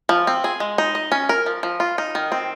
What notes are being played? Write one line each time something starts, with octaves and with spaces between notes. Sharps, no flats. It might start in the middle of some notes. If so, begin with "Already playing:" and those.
F3
C4
G#4
G#3
D#4
D#5
C#4
A#4
F3
F3
F4
D#4
D#3
C4